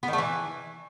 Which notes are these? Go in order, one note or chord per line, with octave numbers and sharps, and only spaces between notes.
B3
D#3
A3
E3